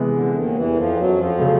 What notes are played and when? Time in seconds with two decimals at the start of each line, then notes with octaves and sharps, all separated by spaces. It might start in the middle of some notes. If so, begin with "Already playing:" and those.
Already playing: C3 E3 G#3 B3
0.14 D3
0.34 D#2 D#3
0.55 E2 E3
0.76 F2 F3
0.97 F#2 F#3
1.17 F2 F3
1.39 C#3 F#3 A3